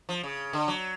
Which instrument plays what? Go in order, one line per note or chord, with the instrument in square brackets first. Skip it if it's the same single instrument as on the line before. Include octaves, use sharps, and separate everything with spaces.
[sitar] F3
C#3
D3
F#3